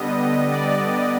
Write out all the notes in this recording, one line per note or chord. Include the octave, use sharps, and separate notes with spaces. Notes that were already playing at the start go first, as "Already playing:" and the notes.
Already playing: D3 G3 B3 D#5
D5